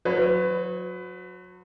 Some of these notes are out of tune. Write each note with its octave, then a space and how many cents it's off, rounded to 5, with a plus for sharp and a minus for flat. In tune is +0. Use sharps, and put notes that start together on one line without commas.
F#3 -30 B4 +30